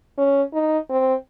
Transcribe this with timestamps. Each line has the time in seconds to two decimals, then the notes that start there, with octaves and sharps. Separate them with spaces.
0.18 C#4
0.53 D#4
0.90 C4